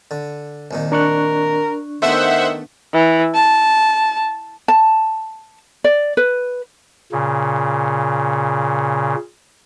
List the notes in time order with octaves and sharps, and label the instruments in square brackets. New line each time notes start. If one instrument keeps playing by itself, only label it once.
[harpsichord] D3
C2 A#2 D#3
[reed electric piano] D4 C#6 F#6 [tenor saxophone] A#4
[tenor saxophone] D#3 [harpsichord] A3 B3 G4 [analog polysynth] C5 E5 F#5
[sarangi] E3
A5
[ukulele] A5
D5
B4
[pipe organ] A#2 C#3